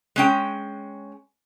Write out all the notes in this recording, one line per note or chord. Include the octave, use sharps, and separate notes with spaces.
G#3 C#4 G5